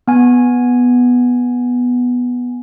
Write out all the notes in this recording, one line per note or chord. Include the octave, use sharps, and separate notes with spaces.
B3 G#5